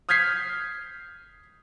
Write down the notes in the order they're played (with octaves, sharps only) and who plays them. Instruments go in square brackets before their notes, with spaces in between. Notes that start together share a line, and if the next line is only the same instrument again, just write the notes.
[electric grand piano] D#6 F6 G6 G#6 B6 C7